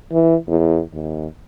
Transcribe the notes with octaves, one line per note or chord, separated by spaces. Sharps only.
E3
E2
D#2